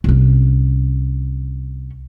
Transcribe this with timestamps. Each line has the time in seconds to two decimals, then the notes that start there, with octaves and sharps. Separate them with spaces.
0.04 C2 C#4